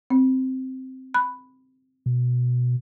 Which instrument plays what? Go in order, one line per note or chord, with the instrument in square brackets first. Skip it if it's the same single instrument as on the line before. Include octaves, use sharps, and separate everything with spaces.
[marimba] C4
B5 F#6
[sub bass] B2